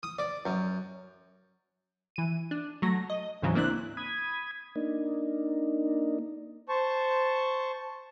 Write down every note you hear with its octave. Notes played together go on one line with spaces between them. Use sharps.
D#6
D5
F#2
E3 D#7
D4
F#3 A3 A#6
D#5
D2 G#2 C#3 E3 F#3
A#3 C4 D4 E4 F#6
B5 D#6 G#6
A#3 D4 D#4
C5 A5 C#6